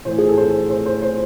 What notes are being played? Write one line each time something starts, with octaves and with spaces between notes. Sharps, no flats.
A2 E3 A3 C5
G#4
A4
C5
C5
C5
C5